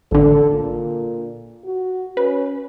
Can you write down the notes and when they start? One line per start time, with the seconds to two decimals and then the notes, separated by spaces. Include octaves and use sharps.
0.12 A1 D3 A4
0.50 A#2
1.65 F#4
2.17 C#4 B4